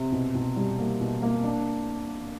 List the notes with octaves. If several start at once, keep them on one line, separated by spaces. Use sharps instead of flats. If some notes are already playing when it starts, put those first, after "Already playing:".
Already playing: C3
B2
B2
G3
A#3
B2
A#3
D4